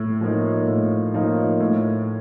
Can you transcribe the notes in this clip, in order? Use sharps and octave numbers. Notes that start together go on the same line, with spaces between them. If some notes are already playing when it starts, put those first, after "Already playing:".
Already playing: A2
F3 A#3 D#4
A2
F3 A#3 D#4
A2